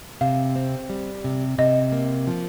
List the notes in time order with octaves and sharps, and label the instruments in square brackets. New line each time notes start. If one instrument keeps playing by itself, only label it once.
[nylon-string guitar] C3 [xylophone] F5
[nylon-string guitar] C4
G3
C3
[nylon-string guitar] C3 [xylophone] D#5
[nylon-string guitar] A#3
F3